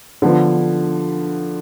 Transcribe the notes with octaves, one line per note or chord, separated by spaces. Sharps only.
D3 F3 B3